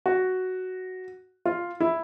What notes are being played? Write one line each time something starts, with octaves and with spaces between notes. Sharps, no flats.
F#4
F4
E4